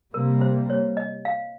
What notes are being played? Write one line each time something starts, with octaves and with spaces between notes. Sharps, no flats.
C3 G3 A#3 A#4
C5
C#5
D#5
F5